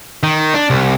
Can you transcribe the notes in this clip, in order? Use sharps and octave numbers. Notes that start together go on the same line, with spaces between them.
D#3
D4
C2